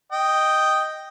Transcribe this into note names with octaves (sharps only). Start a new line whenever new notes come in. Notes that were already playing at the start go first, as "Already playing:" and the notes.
D#5 G5